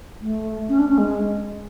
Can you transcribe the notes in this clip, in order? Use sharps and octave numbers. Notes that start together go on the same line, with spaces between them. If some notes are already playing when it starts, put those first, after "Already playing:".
A3
C#4
D4
C#4
G#3